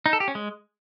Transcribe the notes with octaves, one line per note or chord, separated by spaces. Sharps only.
D#4
A4
G4
C#4
G#3